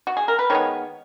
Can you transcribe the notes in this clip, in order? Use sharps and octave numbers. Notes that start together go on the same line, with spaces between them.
F#4
G#4
A#4
B4
D#3 G#3 B3 C#5